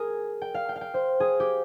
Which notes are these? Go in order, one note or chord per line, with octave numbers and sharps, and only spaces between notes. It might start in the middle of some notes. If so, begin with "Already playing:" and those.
Already playing: G#4 A#4
G5
F5
G5
F5
G5
C5
G#4
G4